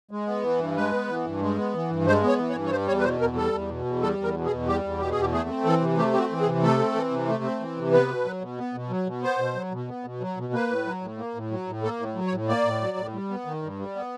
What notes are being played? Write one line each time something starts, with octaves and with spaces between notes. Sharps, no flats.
G#3
B3
E3
G2
G#3 B4
B3
E3
G2
G#3
B3
E3
G2
G#3 C5
B3 C#5
E3
C#5
G2
C#5
G3 C5
E2 C#5
B4
B2 C5
E2 A#4
G3 A4
E2
B2
E2
G3 A4
E2 A#4
B2
G#4
E2
G3 G4
E2
B2 G4
G#4
E2 G4
A3 G#4
C4
E3 A4
C3
A3 G4
C4 G4
F#4
E3
G#4
C3
A3 A4
C4
E3
C3
A3
C4
E3
C3
B3 B4
B2
F#3
B2
B3
B2
F#3
B2
B3 C5
B2
F#3
B2
B3
B2
F#3
B2
A#3 B4
A2
F#3
A2
A#3
A2
F#3
A2
A#3 A4
A2
F#3
C#5
A2
A#3 D5
A2
F#3
A2
G3
B3
D#3
G2
G3
B3